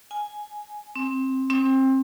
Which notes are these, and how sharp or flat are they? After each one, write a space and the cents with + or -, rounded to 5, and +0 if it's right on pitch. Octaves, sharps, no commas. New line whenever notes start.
G#5 +5
C4 +15
C4 +25